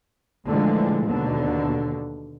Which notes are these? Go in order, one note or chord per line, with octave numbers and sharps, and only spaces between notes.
A#2 D3 E3 F3 G#3 A3
D#2 B2 D3